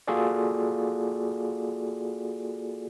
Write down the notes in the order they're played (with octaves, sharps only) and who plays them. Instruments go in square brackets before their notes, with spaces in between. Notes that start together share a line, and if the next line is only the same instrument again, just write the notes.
[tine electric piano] A#3 F4 F#4 G#4 A4 D5